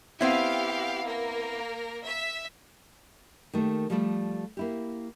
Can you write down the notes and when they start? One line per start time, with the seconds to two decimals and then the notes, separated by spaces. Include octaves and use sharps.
0.21 B3 C4 E4 G4 F5
1.06 A#3 A#4
2.05 E5
3.53 D#3 A3 A#3 G4
3.90 F3 G3 A3 A4 D5
4.57 A#3 E4 G4